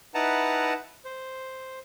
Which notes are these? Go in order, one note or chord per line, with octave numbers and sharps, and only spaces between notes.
D#4 E4 B4 F#5 A5 A#5
C5